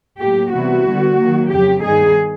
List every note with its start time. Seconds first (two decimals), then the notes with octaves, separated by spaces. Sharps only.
0.20 A2 F#3 A#3 G4
0.53 C3 E3 G3 B3 E4 F#4
0.86 D3 G3 B3
1.18 D#3 F#3 A#3
1.50 F2 C#3 F#3 G4
1.82 G2 D#3 G3 B3 D#4 G#4